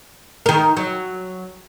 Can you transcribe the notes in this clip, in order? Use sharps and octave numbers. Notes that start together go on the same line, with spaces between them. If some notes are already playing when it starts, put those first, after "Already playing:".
D#3 A#4
F#3